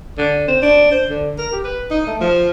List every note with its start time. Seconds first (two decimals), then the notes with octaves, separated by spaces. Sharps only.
0.18 D3
0.48 C4
0.62 D4
0.92 C5
1.09 D3
1.38 A#4
1.52 G4
1.64 B4
1.91 D#4
2.07 A3
2.21 F3